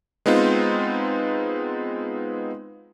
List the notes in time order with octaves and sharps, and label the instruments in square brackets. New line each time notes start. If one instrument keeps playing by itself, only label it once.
[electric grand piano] G#3 B3 C4 D#4 F4